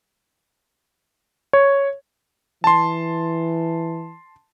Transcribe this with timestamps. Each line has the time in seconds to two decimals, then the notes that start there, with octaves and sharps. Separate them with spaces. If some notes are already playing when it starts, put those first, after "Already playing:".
1.53 C#5
2.64 E3 A5 C6